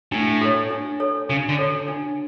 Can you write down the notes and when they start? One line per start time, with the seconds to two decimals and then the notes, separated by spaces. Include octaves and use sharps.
0.12 A2 D4
0.41 A4 C#5
0.70 D4
1.00 A4 C#5
1.29 C#3 D4
1.49 D3
1.58 A4 C#5
1.88 D4